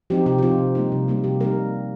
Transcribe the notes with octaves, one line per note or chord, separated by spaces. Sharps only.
F3 C4 D#4 G4
C3 G4
G4
F3 C4 D#4 F4
C3
G3 A#3 D#4
C3
G3 A#3 D#4
C3 G4
G3 A#3 D#4 A#4